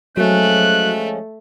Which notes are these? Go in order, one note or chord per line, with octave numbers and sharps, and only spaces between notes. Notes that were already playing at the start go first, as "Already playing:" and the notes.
F3 F#3 G#3 A3 C#4 F#6